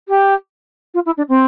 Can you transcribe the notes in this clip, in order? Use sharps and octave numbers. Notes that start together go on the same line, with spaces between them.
G4
F4
E4
D4
C4